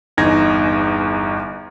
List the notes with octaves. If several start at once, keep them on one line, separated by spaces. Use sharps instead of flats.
G1 E2 D#4 G#6 A#6